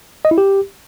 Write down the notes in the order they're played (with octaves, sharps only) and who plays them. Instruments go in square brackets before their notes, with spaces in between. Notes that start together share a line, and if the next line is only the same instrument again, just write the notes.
[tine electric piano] D#5
E4
G4